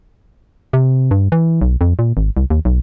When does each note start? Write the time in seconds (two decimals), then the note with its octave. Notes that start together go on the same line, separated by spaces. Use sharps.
0.73 C3
1.11 G2
1.32 E3
1.62 B1
1.81 F2
1.99 A#2
2.17 G#1
2.37 C2
2.50 D#2
2.65 B1